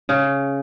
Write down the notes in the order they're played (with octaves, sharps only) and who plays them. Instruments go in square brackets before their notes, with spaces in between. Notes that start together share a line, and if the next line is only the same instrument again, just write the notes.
[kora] C#3